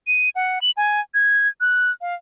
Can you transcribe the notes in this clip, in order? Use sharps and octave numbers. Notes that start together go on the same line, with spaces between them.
D#7
F#5
F#7
G#5
G#6
F#6
F5